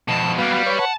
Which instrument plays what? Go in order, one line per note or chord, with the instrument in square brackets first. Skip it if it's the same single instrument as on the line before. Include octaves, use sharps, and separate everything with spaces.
[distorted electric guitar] F2 B2 [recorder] A5
[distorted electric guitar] G3 A#3 [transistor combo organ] B3 F#4 [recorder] F5
[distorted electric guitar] G3
[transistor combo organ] B4 C#5
[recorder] F#5 [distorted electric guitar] A5